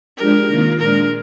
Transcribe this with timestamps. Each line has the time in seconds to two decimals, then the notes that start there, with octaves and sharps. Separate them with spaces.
0.17 F3 G#3 D4 G4 A#4
0.48 C3 D#3 A#3 F4
0.78 A#2 F3 G#3 D4 A#4